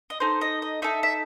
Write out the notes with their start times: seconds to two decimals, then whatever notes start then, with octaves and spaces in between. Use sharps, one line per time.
0.10 D#5
0.20 D#4 A4 C5
0.41 D#5
0.62 D#5
0.82 D#4 A4 E5
1.03 E5